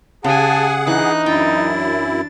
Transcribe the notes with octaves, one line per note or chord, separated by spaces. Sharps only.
C#3 G4 G#4 F#5 G#5 A5
E3 D4 D#4 F#6
F#2 D4 E4 G5 A6